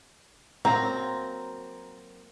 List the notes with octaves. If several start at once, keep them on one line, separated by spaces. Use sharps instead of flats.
F#3 A#3 C4 A#5